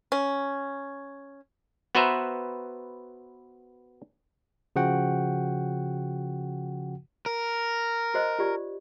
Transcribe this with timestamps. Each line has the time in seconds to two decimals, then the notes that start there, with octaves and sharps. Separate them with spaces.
0.12 C#4
1.95 B3 F#4 B4 C5 E5 A#5
4.76 C#3 F3 F#4 F#5 G5
7.26 A#4
8.14 F#4 C5 D#5
8.39 F4 G4 D5